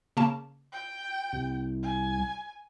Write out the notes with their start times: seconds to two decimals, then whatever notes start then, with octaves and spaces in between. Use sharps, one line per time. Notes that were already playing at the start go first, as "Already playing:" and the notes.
0.17 C#3 A#3 A5
0.73 G5
1.33 C2
1.83 G#5